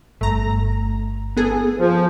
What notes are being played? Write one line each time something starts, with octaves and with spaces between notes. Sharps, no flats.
G1 A3 A#5
B3 G#4 A4
F3